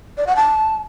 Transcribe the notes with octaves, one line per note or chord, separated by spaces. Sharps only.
D5
F#5
A5